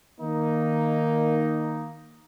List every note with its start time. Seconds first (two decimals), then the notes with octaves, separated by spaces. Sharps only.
0.20 D#3 A#3 D#4